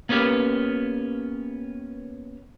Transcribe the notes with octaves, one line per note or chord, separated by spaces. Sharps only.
A#3 B3 C#4 G4 A#4 B4